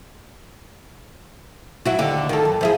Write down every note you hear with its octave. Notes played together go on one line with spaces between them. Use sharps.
F#3 E4 F#4
D#2 D3 G4
D#3 A4
F#2
F3 E4 G#4